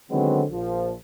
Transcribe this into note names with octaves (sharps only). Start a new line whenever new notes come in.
D3 D#3 F#3 G#3 B3 C4
A#1 F3